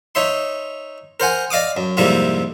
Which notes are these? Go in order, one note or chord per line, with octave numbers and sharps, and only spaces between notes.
D#4 C#5 E5 C6
A#4 C5 F#5 G#5
D5 D#5 F5 D6 D#6
F#2
F2 G#2 C3 G3 A#3 E4